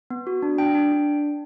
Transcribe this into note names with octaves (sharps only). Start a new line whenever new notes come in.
B3
F#4
D4
D4 G5
D4
D4